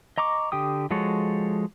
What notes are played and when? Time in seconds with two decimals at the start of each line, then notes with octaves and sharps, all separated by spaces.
0.18 D#5 A#5 C#6 D6
0.52 D3 G4 G5 D#6
0.91 F3 G#3 F#4 A4 C#5